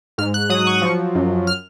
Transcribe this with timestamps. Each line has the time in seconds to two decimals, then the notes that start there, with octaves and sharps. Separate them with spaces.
0.18 G#2 F6
0.34 F#6
0.50 F#3 D#6
0.67 C#6
0.82 F3
1.15 F#2
1.47 F6